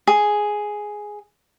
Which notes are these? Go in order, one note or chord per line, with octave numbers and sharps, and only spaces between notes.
G#4